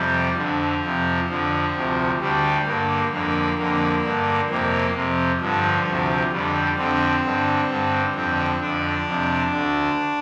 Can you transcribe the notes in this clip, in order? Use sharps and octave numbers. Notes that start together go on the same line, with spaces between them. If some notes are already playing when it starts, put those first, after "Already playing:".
Already playing: F2 C3 G3
F2 D3 F3
F2 C3
F2 D3 F3
D2 C3
D2 D3 G3
G2 D3 A#3
F2 D3 A#3
F2 D3 A#3
G2 D3
F2 C3 A#3
F2 C3
G2 D3 F3
D2 C3
F2 D3 G3
F2 D3 C4
G2 D3
G2 D3
F2 D3 C4
F2 D3 D4
F2 C3
D2 D3